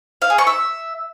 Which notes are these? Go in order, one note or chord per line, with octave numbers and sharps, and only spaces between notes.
F5
G#4
C#6
E5